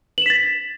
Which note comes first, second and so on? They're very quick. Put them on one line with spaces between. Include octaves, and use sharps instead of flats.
F#7 E7 B6 A6